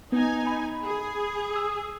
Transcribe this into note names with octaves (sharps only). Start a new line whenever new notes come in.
B3 D#4 G#5
B5
G#4
D#6 E6